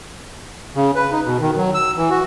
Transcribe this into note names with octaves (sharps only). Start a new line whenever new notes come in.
C#3
B4
D#4
B2
D#3
F#3
E6
E3
F#4